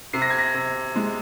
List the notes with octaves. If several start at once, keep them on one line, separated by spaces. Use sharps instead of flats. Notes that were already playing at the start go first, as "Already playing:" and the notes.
C3 C7
A#6
G#6
A#6
C3
G#3